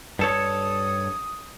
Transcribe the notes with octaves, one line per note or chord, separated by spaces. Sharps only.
G2 A4 C#5 D#6